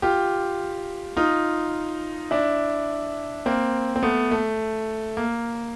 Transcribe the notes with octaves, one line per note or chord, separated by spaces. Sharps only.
F4 G4
D#4 F4
D4 E4
A#3 C4
C4
A3 B3
A3
A#3